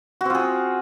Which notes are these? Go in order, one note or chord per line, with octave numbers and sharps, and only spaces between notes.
C4 F4 F#4 G#4